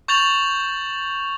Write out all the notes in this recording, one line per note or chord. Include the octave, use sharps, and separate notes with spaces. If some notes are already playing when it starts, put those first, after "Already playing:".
C#6 G6 A6 F7 F#7